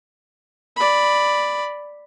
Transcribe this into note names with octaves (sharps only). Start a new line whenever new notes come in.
D5 B5